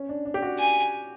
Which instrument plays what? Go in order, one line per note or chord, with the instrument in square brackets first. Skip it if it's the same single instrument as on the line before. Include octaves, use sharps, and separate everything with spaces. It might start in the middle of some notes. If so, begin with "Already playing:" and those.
Already playing: [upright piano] C#4
D4
D4
G4
F#4
[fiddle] G#5